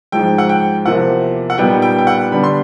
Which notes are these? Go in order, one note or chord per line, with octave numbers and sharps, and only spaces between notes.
G#2 F3 G#3 G5
F#5
G5
E2 C3 F3 A#3 F#5
F#5
A#2 G3 B3 D#4 G5
G5
G5
F#5
D3 G3 B3 D4 B5
C6